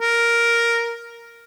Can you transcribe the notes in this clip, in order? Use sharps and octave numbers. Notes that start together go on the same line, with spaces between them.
A#4